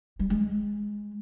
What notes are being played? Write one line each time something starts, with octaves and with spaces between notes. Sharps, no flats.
G3
G#3